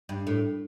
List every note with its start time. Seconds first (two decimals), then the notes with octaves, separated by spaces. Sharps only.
0.09 G2
0.27 A2